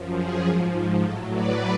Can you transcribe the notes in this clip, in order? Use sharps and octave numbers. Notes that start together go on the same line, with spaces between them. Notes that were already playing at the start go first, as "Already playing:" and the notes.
Already playing: F#2 F3
G#4
G#2 F3
A2 F#3 A4
B4 D5